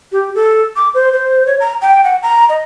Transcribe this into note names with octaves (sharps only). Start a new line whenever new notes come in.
G4
A4
D6
C5
C5
C#5
A#5
G5
F#5
A#5
D#5